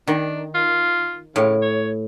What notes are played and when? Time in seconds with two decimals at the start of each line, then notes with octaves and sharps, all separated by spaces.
0.07 D#3 D4
0.54 F4
1.36 A2 C#3
1.62 C#5